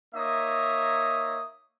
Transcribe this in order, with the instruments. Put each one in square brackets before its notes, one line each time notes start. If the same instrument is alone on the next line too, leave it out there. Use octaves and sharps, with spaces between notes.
[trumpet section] A#3 D#4 C#5 E5 D#6